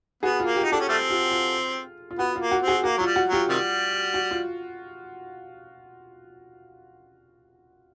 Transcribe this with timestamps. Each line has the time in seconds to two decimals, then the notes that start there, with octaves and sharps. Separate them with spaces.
0.23 B3 F#4 G#4
0.40 F4
0.45 A#3
0.55 F4 G4
0.63 D#4
0.72 D4 G4 A4
0.80 C#4
0.89 G3 A3 C4
1.10 F4 G4
1.31 F4
2.11 F4
2.19 B3 F#4
2.36 A#3 F4
2.51 F#4
2.62 C4
2.67 F#4 G#4
2.84 A#3 F#4
2.97 F#3 F4
3.06 G3
3.16 F#4
3.27 F#3
3.32 F4 G4
3.49 C3 D#3 G3
4.14 F#4
4.31 F4